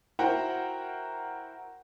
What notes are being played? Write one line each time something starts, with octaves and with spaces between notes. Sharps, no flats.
E4 F#4 A#4 C5 F#5 G5